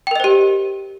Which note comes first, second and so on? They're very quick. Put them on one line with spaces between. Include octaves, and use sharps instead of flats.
G5 A#4 D#5 C5 G4